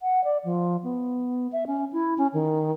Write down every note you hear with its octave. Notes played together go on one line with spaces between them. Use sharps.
F#5
D5
F3
B3
E5
C#4
E4
C#4
D#3